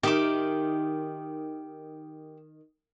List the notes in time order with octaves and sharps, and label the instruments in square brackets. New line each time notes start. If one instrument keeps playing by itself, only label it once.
[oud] D#3 [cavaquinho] G4 E5 D6